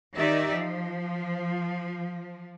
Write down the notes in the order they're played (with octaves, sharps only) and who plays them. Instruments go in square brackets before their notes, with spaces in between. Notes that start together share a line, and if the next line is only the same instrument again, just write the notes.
[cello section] D#3 D#4 G4 D5 E5
F3